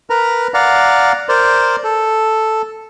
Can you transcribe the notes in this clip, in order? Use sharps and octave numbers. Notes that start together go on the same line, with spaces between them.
A#4 B4 A#5
D5 F5 F#5 A#5
A#4 C5 D5
A4